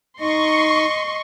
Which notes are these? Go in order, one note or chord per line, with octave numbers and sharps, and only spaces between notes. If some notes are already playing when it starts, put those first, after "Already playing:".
D#4 D#5 C6 C#6